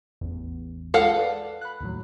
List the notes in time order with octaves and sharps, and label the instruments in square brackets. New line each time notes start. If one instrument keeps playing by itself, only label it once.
[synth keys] A1 E2
[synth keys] G#3 F4 G#4 [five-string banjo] A4 F5 F#5
[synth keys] B4 D5
B5 F#6
D#2 A2 F#3